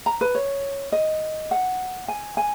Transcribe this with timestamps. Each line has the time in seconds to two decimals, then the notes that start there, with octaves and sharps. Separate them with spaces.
0.06 A#5
0.21 B4
0.35 C#5
0.92 D#5
1.51 F#5
2.08 G#5
2.37 G#5